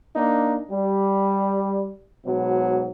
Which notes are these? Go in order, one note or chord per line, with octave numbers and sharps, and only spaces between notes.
A#3 D4 D#4
G3
G#2 B2 F#3